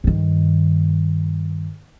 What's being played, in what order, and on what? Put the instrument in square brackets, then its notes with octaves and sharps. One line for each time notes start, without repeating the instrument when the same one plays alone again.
[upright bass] G2 D#3